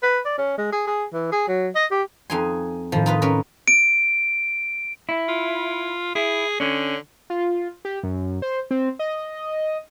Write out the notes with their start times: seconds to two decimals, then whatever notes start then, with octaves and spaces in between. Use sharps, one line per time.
0.03 B4
0.25 D5
0.38 C#4
0.58 G#3
0.72 G#4
0.87 G#4
1.13 E3
1.32 G#4
1.48 F#3
1.75 D#5
1.91 G4
2.30 F2 D#4 G#5 C6
2.92 A2 D#3 F3
3.06 D#4 F4 B4
3.22 C#4 A#4 B4
3.68 D7
5.09 E4
5.29 F4
6.15 E4 G#4
6.60 D3 C#4
7.30 F4
7.85 G4
8.03 F#2
8.42 C5
8.71 C4
8.99 D#5